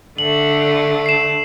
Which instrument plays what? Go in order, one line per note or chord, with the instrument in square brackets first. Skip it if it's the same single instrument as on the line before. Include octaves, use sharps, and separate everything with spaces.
[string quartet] D3 A3 [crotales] F#7
[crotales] C7 E7